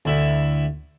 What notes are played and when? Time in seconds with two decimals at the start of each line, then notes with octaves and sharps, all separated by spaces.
0.05 D2 E4